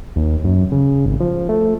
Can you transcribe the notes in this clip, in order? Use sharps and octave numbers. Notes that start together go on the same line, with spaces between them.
D#2
F#2
C#3
G#1
F3
A3